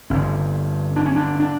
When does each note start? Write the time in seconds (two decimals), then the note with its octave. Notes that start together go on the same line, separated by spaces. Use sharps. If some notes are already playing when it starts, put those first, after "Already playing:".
0.10 G1 G2 D3 C#4
0.96 D4
1.05 C#4
1.16 D4
1.40 D4